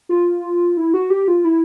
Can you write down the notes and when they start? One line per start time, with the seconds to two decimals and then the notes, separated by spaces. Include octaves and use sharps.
0.09 F4
0.77 E4
0.94 F#4
1.10 G4
1.28 F4
1.44 E4